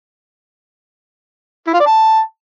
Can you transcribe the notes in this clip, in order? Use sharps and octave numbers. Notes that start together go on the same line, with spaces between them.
E4
F4
D5
A5